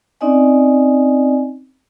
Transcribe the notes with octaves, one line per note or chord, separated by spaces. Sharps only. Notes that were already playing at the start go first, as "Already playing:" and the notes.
C4 C#4 D#4 D5 D#5 G#5